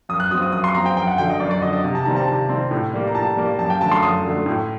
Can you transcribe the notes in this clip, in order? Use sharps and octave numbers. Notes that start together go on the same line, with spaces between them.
F#2 D#6
F#6
F#3 C4 D#6
D#6
F#2 D#6
C6
F#3 C4 A#5
G5
F#2 G5
F#5
D3 F#3 G5
D#5
F#2 D5
D5
D3 F#3 D#5
D#5
C3
A5
D#3 G3 C4 A#5
A5
C3
D#3 G3 C4
A2
G3 A#3
A#5
A2 A5
G3 A#3
F#2 A5
G5
D3 F#3 A3 A5
C6
F#2 D#6
D3 F#3 A3
A2